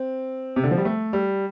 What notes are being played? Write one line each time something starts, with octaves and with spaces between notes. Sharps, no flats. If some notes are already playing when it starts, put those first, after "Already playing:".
Already playing: C4
C3
D3
F3
G3
A3
G3